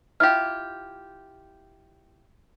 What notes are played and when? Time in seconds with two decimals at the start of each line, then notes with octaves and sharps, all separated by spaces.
0.20 E4 F4 G4 F6